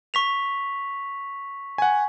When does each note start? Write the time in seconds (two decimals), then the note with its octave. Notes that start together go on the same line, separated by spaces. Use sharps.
0.14 C#6 B6 F7
1.78 F#5 G#5